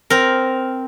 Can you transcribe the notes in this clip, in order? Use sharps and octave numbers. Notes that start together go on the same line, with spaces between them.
C4 A#4